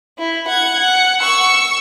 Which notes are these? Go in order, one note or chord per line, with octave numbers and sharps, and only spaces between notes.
E4
F#5 G#6
F#5
C#6 E6